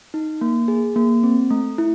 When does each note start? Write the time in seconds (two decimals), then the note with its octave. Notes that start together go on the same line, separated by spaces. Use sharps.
0.14 D#4
0.41 A#3
0.68 G#4
0.96 A#3
1.23 C4
1.50 A3
1.78 E4